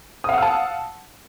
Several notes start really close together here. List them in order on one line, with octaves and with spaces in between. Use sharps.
D#6 F5 F#5 E6 A5